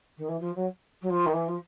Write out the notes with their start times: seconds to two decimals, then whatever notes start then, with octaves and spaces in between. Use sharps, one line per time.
0.17 D#3
0.28 E3
0.40 F3
0.55 F#3
1.01 F#3
1.10 F3
1.26 D#3
1.33 E3
1.48 F3